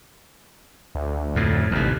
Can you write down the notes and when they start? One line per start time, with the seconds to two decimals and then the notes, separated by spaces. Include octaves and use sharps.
0.95 D2
1.35 F2 A2
1.71 A1 D#2 C3